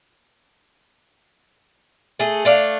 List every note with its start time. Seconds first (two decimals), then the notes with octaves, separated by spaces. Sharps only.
2.19 A3 G#4
2.45 A3 D4 F5